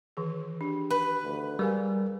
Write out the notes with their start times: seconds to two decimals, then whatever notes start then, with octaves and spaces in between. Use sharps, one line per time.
0.17 D#3 E3 G#4
0.61 D4 G4
0.90 B4
1.23 D2
1.59 G3 G#4 A#4 F5 G#5